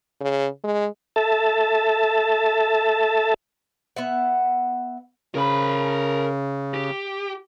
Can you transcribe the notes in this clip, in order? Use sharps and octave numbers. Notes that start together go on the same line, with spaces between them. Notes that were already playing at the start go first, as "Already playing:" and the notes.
C#3
G#3
A4 E5 A5
B3 E5 F#5
C#3 A#4 B5
G4